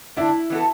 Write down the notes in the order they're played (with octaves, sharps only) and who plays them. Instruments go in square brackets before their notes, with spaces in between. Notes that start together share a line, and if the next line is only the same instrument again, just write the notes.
[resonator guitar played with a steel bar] D3 A3 D4 [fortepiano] E4
[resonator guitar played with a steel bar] E3 B3 D4 F#4 A4